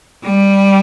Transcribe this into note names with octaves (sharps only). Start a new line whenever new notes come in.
G3